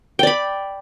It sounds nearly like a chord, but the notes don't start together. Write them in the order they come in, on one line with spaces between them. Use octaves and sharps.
G5 D5 B5